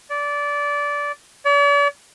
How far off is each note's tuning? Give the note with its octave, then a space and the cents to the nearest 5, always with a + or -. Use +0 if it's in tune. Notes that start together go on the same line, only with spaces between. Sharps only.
D5 -20
D5 -45